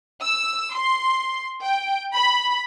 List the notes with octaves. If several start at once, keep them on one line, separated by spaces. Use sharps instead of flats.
E6
C6
G5
B5